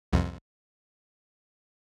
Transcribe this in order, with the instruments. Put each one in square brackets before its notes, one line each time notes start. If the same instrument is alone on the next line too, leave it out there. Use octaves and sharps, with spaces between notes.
[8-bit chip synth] C2 F2